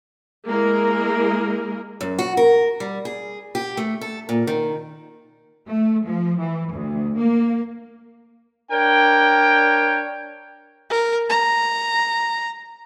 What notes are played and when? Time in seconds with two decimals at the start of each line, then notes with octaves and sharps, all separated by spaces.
0.47 G#3 A#3 E4 G#4 A#4
2.01 F#2
2.19 F#4
2.37 A#4
2.80 G3
3.05 G#4
3.55 G4
3.77 A3
4.01 A4
4.29 A#2
4.47 D#3
5.68 A3
6.05 F3
6.39 E3
6.73 D2
7.17 A#3
8.70 D4 A#4 C#5 G5
10.90 A#4
11.30 A#5